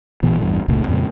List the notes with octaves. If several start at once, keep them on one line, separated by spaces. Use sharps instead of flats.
A1 A#2 E3 B3
A1 E2 G2
F1 C#2 A#2 A3
F2 A#2 C#3 G#3